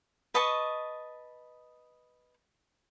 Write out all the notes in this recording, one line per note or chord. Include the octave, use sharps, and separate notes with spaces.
B4 D#5 A5 C#6